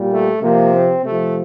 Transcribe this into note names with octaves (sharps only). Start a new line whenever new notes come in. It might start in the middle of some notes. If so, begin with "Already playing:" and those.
Already playing: A#2 G3
A3
C3 F3 A#3
C4
C3 F3 A3